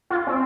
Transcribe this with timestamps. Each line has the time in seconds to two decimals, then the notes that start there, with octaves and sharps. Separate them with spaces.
0.10 F4
0.27 C4